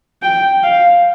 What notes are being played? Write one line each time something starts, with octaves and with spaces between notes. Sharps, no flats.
G5
F5